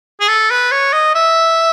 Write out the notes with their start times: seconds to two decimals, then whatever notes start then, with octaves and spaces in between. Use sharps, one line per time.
0.21 G#4
0.28 A4
0.51 B4
0.72 C#5
0.93 D#5
1.15 E5